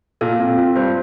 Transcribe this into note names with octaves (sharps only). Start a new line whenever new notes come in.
A#2 A4
A#2 C4
F4
G2 C5